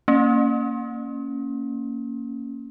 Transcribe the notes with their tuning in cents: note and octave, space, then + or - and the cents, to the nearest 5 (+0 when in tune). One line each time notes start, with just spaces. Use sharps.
A#3 -10 C#4 +0